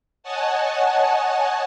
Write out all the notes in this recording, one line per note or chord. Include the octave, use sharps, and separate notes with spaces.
C#5 D#5 F#5 G#5 A5